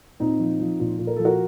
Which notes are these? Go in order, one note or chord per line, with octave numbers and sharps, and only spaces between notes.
A#2 C4 D#4
F3
F3
A#2
A#2
A#4
F3 A4
F#4 A#4